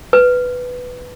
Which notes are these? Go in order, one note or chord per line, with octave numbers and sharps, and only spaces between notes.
B4